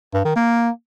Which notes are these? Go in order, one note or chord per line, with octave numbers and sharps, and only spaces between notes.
G2
D#3
A#3